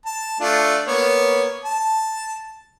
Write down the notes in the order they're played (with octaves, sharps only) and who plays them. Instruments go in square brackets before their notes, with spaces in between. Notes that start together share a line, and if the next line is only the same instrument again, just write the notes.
[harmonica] A5
A3 D4 F4
A#3 B3 C#5
A5